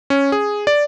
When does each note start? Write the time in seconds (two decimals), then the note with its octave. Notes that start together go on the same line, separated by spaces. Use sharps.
0.10 C#4
0.32 G#4
0.67 D5